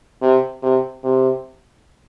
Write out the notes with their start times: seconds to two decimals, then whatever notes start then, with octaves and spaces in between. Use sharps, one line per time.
0.22 C3
0.63 C3
1.04 C3